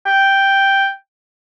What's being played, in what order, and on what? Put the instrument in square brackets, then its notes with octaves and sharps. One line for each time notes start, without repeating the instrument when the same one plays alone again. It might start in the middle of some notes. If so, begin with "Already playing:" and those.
[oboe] G5